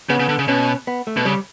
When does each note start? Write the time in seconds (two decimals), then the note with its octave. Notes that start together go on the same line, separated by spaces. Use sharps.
0.09 C#3 B3
0.20 C#3
0.29 D3
0.39 C#3
0.48 B2 C#4
0.87 B3
1.07 A3
1.17 B2
1.25 C#3 G3